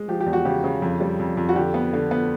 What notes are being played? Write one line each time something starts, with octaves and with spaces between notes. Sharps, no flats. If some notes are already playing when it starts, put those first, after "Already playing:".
Already playing: G#3
F3 G4
G4
E2
F#4
C#3 G4
C#3
F2
G3
F2
F2
F#4
D3 G4
B3
D3
B3